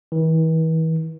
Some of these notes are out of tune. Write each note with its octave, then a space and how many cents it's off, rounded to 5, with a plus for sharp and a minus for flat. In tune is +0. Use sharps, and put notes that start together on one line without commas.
E3 -40